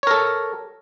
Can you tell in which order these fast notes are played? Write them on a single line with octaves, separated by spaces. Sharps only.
C#5 A#4 A4